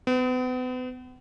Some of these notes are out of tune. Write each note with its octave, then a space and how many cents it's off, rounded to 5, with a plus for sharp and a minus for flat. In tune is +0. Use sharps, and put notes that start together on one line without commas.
B3 +40